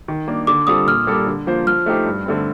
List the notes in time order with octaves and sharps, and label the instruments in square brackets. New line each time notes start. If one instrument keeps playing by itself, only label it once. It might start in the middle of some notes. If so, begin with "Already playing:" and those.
[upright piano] D#3
A#3 D4
[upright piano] D3 [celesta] D6
[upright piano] G3 C4 F4 A4 [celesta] D#6
[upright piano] A#2 [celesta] F6
[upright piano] G3 A#3 D4 A4
D3
F3 A#3 F4 C5
[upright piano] F3 [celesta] F6
[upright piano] A3 D#4 G4 C5
G2
D3 A3 C4